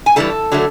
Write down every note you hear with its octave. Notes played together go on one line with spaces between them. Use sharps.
G#5
G2 E3 G3 A4 A5
D3 F#3 A3